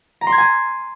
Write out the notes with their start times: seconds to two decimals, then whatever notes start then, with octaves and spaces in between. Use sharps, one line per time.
0.21 A#5
0.27 C6
0.32 G#6
0.38 G#5